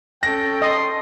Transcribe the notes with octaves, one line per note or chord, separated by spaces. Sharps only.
C#4 A4 G5 A#6
D#5 C6